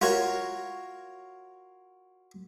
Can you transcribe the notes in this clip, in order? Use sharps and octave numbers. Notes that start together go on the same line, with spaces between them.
F4 F#4 A#4 C#5